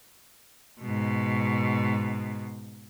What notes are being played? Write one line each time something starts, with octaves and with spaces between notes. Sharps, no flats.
G#2 B2